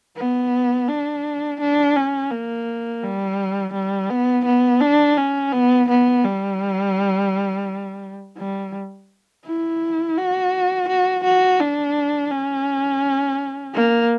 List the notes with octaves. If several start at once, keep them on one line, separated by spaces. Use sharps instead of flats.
B3
D4
D4
C#4
A#3
G3
G3
B3
B3
D4
C#4
B3
B3
G3
G3
E4
F#4
F#4
F#4
D4
C#4
A#3